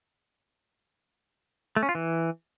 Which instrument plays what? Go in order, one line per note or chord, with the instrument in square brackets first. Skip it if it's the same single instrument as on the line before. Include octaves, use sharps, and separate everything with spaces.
[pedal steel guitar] A3
C#4
F4
E3